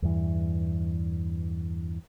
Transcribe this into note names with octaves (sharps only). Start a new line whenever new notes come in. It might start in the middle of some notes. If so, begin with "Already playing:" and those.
E2 G2 E3